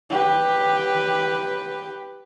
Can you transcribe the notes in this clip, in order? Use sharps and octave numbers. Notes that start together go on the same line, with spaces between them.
G4 B4